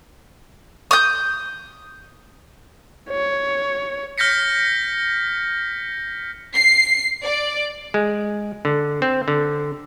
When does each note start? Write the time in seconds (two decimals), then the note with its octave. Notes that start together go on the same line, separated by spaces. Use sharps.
0.91 D#6 G6
3.10 C#5
4.18 F6 G6 A#6 B6 C#7
6.56 C7
7.22 D5
7.94 G#3
8.65 D3
9.02 C4
9.28 D3